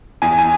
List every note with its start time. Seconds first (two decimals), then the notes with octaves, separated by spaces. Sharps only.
0.22 E2 G#5
0.39 G#5